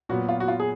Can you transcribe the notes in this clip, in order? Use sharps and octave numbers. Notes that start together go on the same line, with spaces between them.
A#2 F#3 B3 F#4
F4
F#4
F4
G#4